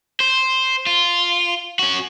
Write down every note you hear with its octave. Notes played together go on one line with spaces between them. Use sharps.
C5
F4
C#4 F#4